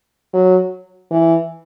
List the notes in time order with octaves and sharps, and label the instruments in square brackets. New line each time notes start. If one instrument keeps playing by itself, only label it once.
[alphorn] F#3
E3